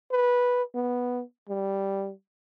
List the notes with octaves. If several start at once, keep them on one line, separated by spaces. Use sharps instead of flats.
B4
B3
G3